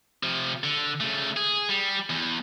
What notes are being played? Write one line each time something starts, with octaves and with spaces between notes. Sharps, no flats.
C3 F3
D3
C#3 A3
G#4
G3
E2